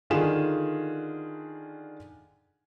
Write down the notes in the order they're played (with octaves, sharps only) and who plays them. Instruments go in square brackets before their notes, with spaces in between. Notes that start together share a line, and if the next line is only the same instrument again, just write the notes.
[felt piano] D3 D#3 F4 G#4 E7